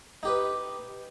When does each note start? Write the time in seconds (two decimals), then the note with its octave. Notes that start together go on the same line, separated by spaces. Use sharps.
0.23 D#4 G4 B4